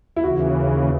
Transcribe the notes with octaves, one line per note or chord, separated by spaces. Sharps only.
E4
D#2 C#3 E3 F#4